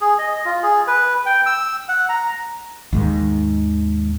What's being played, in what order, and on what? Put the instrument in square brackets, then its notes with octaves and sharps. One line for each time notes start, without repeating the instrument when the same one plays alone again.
[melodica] G#4
D#5
F4
G#4
B4
G5
E6
F#5
A#5
[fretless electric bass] D#2 G#2 D#3